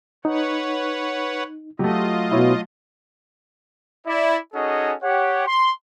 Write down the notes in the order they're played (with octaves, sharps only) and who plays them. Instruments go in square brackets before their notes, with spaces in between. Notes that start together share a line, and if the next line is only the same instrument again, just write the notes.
[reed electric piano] D#4 [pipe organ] B4 C#5 F#5
[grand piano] F#3 A3 [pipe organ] F4 D#5 [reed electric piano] G4
[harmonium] B2 [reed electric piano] E4 C#5
[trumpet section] E4 D5
C#4 D#4 F#4 G#4 A4 D#5
G4 C#5 F#5
C6